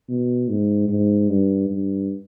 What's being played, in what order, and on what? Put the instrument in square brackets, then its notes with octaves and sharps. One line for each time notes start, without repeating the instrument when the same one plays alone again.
[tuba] B2
G#2
G#2
G2
G2